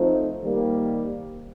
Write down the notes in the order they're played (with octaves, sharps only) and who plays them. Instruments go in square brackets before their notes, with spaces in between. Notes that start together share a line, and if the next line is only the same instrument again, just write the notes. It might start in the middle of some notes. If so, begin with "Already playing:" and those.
Already playing: [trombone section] F3 A3 C4 D#4 [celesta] C5
[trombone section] D#3 G3 A#3